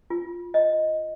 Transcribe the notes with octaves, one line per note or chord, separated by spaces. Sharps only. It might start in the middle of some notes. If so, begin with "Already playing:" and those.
F4
D#5